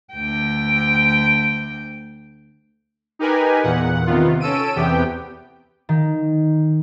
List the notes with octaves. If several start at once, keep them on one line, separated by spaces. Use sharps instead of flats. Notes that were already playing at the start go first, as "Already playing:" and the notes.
D2 G5
D#4 G4 A#4 B4 G#5
E2 A#2 F#5
C3 D#3 B3 F4
C#4 A4 E6 D7 D#7
E2 C3 B3 G4 G5
D#3